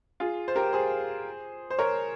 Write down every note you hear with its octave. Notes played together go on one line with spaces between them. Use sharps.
F4 G#4
C5
G4 A#4
G#4 C5
C5
A#4 C#5